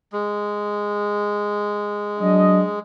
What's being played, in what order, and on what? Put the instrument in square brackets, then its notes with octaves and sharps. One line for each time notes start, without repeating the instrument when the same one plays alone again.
[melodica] G#3
[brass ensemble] F#3 D4 D#5